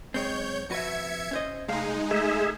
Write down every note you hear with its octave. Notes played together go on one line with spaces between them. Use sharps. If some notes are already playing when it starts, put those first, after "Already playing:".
B1 G#3 C4 C#5 G6
F2 F#4 B4 E5 G#6 C#7
C#4 C5 D#5
C2 G#3 A3 D#4 F5
A3 G#4 E5